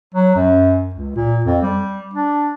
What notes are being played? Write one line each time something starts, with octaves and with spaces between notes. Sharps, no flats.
F#3
F#2
C#2
A#2
F2
G3
D4